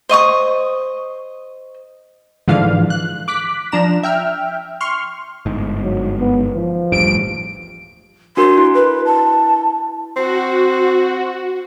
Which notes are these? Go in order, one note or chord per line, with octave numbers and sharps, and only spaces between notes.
C5 D#5 C#6 D#6
G#2 D3 E3 F3 F5
F#6
D6 F#6 B6
F3 D4 A#5 E7
E5 G5 F6
C6 C#6 F6
G1 G#2
F#3
B3
F3
D#1 A1 G2 D7
D4 F#4 A#4 C6
E4
B4
A5
C4 F#4